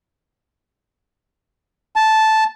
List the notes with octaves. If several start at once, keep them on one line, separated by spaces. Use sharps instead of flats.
A5